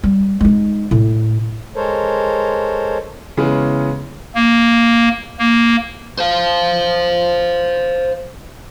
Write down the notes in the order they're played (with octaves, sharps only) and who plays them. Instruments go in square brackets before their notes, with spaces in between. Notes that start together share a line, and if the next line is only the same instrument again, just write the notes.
[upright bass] G3
G#3 D#4
A2
[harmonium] G#3 A4 A#4 C5 C#5
[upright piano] C#3 E3 G#3 B3 C#4
[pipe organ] A#3
A#3
[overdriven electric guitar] C5 F5